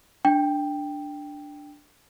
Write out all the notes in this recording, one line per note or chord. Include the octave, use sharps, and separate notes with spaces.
D4 G5